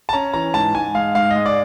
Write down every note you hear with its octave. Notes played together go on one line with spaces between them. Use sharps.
A5
C#4 A#5
E3 A#5
G#2 A5
G#2 G#5
G#3 F5
G#2 F5
D#5
G#3
D5